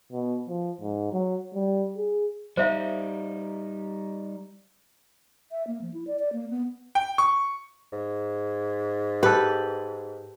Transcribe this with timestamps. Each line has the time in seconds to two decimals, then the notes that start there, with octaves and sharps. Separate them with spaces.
0.12 B2
0.49 F3
0.81 G#2
1.13 F#3
1.54 G3
1.98 G#4
2.57 G3 D#4 C5 E5 F5
5.51 E5
5.67 A#3
5.82 F3
5.94 E4
6.07 D5
6.19 D5
6.33 A#3
6.50 B3
6.95 G5
7.18 C#6
7.93 G#2
9.23 G4 A4 B4